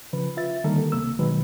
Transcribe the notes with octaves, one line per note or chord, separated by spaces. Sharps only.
C#3 F3 B4
F4 E5 A6
D3 D#3 G3 A#3 A4 A#4
C#2 C3 A#3 E6
B2 D#3 F#3 G#3 B4